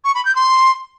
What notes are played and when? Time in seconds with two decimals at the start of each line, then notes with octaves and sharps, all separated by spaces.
0.04 C#6
0.15 B5
0.25 G6
0.35 C6